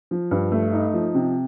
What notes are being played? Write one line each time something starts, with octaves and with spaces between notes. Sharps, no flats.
F3
G2
A3
D#4
F3
C3